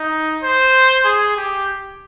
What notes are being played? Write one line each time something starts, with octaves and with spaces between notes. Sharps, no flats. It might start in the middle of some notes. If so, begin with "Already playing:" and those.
Already playing: D#4
C5
G#4
G4